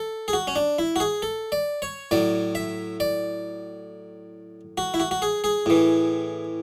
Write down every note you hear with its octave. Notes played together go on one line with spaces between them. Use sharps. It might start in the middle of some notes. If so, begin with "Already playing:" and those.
Already playing: A4
G#4
F#4
C#4
D4
E4
F#4
G#4
A4
D5
C#5
A2 F#3 D5
E5
D5
F#4
E4
F#4
F#4
G#4
G#4
A2 E3